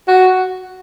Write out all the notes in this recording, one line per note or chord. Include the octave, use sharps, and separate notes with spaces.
F#4